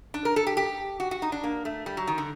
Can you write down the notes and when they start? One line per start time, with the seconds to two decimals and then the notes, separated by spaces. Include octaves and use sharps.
0.14 D4
0.25 A#4
0.36 A4
0.47 G4
0.57 G4
1.00 F#4
1.11 F#4
1.22 D#4
1.32 D4
1.44 A#3
1.65 A3
1.86 G3
1.97 F#3
2.07 D#3
2.18 D3